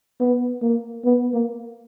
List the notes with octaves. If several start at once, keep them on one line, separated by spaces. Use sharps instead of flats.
B3
A#3
B3
A#3